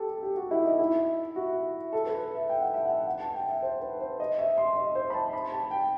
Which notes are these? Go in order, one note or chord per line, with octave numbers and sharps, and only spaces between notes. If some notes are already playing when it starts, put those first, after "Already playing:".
Already playing: G4 A4
G4
F#4
E4
D#4
E4
F#4
A4
B4
E5
G5
F#5
E5
F#5
F#5
A5
G5
E5
C5
B4
C5
D#5
E5
C6
D#5
C5
B5
A5
B5
A5
G5